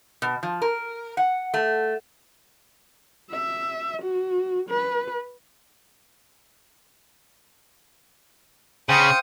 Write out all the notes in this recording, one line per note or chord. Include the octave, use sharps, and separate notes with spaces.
B2
F3
A#4
F#5
A3
E5
F#4
B4
C#3 C5 F5 G5 D#6 C#7